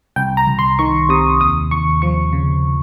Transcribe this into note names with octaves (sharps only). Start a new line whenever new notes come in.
C2 G5
A#5
C2
C6
D#3 C#6
C3 D#6
D#2 D#6
D#2 C#6
F3 C#6
C#3